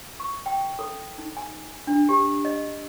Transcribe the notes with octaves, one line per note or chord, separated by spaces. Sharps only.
C#6
G5
A4
D#4
G#5
D4
G4
D#5